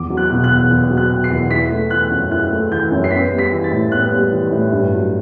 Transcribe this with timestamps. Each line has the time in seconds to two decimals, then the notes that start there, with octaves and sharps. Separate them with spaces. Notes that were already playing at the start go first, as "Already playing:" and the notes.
Already playing: E2 D6
0.10 F#3
0.17 F#6
0.30 B2
0.44 F#6
0.50 E2
0.70 E2 F#6
0.90 F#3
0.97 F#6
1.10 B2
1.24 C7
1.30 E2
1.50 E4 B6
1.70 A3
1.90 E3 F#6
2.11 F#2
2.31 E4 F#6
2.51 A3
2.71 E3 G6
2.92 F#2
3.04 C7
3.11 B3 B6
3.31 G3
3.38 B6
3.52 E3
3.64 A6
3.71 A2
3.92 B3 F#6
4.12 G3
4.32 E3
4.52 A2
4.72 G2
4.92 F#3